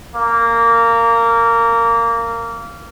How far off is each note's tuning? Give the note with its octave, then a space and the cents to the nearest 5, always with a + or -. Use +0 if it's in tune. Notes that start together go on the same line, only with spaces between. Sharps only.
A#3 -15